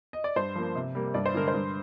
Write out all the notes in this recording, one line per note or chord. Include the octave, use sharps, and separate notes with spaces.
D#5
D5
G2 C5
F3 A#3
C3
G3 A#3
G2 D5
C5
D3 G#3 A#4
C5
G2